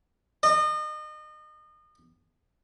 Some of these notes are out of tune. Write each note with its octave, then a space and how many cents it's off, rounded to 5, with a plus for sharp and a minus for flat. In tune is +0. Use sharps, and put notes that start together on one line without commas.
D#5 -35